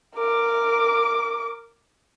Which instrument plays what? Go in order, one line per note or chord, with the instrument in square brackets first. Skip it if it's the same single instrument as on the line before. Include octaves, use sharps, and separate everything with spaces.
[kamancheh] A#4 D6